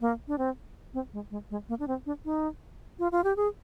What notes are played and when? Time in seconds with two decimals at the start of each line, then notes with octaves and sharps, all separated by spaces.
0.01 A#3
0.28 D4
0.38 C4
0.94 C4
1.13 G#3
1.31 G#3
1.51 G#3
1.69 A#3
1.79 D4
1.88 C4
2.06 D4
2.25 D#4
2.99 F4
3.12 F4
3.24 G4
3.37 G#4